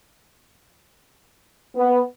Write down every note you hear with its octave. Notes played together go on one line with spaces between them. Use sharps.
B3